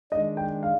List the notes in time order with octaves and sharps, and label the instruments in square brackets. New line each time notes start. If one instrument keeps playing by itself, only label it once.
[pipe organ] D#3 G#3 D4 [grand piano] D#5
[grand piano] G5
F5